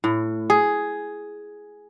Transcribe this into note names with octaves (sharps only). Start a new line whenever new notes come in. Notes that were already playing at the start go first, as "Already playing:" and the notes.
A2
G#4